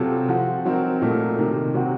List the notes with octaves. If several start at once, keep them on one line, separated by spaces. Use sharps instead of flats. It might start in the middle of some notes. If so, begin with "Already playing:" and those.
Already playing: C3 F#3 C4 F4 A4
F3 C4 F#4
F#3 C4 D#4 F#4 A#4
A#2 F#3 A3 D#4 A#4
C3 D#3 A#3
C3 F#3 C4 F#4